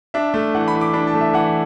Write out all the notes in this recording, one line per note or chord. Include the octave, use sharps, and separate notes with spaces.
D4 E5
A3
E3 F#5
B5
E3
D6
D4 B5
A5
A3
E5
E3 F#5